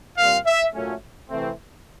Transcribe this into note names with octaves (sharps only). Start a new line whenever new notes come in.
A#2 G3 C4 F5
E5
A#2 F#3 A3 C#4
C3 E3 A3 C4